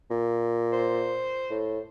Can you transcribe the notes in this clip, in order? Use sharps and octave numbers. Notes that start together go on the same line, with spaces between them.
A#2
C5
A2